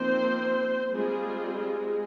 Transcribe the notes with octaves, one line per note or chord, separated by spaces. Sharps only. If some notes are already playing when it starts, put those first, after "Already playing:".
Already playing: F3 A#3 C4 D#4 C5
G3 G#3 C4 F4 G#4
G#3 G#4